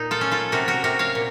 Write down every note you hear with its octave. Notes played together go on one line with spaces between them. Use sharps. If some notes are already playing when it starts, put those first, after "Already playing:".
Already playing: A#2 D#4
F4 A4
C#4
F4 A4
C3 F#4 A#4
F#4 A#4
C3 F#4 A#4
C#5 F5
A#2